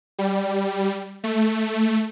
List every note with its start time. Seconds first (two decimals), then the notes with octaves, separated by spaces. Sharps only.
0.19 G3
1.24 A3